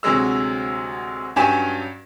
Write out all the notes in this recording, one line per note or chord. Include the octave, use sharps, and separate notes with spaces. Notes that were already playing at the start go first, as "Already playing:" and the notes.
D2 C3 F#3 G#3 E6
G2 F#3 C#4 G4 G#5 E7